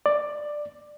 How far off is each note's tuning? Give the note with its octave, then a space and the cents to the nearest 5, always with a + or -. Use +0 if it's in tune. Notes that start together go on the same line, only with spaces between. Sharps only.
D5 +10